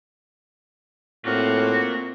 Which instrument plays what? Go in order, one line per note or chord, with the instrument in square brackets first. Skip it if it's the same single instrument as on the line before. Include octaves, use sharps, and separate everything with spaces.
[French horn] A2 [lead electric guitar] A#3 F4 [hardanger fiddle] C4 [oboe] F#4